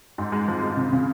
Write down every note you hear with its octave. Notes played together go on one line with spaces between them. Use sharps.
G#2
G#3
F3
G#3
C#3
C#3